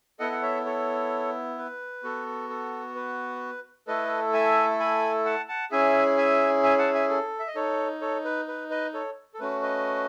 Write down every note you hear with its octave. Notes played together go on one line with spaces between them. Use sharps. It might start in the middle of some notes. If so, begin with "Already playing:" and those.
B3 E4 A4 D#5 F#5
F#5
C#5 E5
A4 C#5
B4
B3 F#4 A4
A4
B4
A3 E4 A4 B4 D#5
E5 G#5
G#5 B5
F#5 A5
F#5 A5
C#4 E4 G#4 E5 G#5
E5 G#5
E5 G#5
F#5 A5
E5 G#5
A4
E5
D#5
D#4 A4 C#5
A4 C#5
B4
B4
B4 D#5
A4 C#5
A4
A3 C#4 F#4 B4
B4 D#5